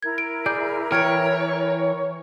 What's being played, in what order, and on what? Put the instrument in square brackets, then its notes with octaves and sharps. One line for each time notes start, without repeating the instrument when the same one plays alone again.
[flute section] E4 A#4 [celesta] G#6
[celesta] D7
[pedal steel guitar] G#4 D5 [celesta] G6
[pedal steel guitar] E3 G5 [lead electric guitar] C#5 [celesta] F6 G#6 D7